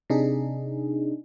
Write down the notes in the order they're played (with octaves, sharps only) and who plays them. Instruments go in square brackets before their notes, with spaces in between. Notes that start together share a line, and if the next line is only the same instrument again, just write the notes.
[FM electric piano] C3 D4 D#4 G#4